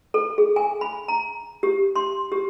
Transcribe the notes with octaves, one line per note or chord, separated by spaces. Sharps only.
A4
G#4
G#5
B5
A#5
G4
C6
G4